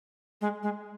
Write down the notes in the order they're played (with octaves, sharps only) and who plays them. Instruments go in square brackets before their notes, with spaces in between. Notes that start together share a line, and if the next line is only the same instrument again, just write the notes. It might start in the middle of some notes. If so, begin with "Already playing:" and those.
[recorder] G#3
G#3